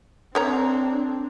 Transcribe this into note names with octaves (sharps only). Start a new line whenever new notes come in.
C4 D4 A4 C#5 A#5